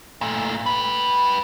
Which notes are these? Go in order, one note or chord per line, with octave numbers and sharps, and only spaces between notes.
A#2 A3
G4 B4